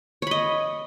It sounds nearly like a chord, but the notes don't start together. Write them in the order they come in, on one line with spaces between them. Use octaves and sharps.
C#5 B5 D#5